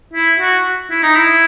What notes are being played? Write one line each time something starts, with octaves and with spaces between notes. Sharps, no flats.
E4
F#4
E4
D#4
E4